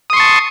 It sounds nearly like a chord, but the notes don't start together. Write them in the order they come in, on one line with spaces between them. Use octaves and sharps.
D#6 C6 C#6 A5